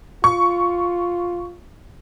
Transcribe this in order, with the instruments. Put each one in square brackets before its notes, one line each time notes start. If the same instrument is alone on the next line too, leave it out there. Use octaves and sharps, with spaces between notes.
[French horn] F4 [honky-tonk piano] C#6